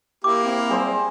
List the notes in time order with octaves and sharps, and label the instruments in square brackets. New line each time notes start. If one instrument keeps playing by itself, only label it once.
[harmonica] A#3 E4 [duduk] G4 [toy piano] D6
[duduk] C4
[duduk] G3 [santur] G#4 C5